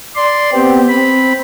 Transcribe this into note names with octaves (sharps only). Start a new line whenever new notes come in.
D5 C6
B3 C4 G4
C4 B5